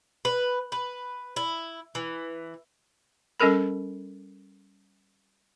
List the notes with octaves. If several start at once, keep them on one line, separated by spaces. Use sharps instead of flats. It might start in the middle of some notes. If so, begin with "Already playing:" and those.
B4
B4
E4
E3
G3 C#4 A4 A#4 B5